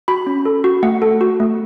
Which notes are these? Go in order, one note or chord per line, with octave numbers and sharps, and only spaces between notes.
F#4 B5
C#4
A4
F#4
A3 F#5
A4
F#4
A3